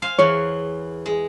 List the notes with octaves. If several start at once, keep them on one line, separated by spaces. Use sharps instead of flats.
C5 F5 G#5
E2 E3 C#5
G#3